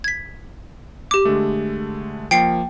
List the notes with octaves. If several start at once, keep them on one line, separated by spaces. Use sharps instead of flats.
G#6 B6
G4 D6
D3 G#3 A3
F3 A#3 G5 C7 C#7